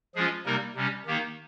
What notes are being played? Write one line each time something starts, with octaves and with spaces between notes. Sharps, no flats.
F3 G#3 C#4 F4 G#4
C3 G3 A#3 D#4 A#4
C3 G3 C#4
D#3 A#3 D#4 G4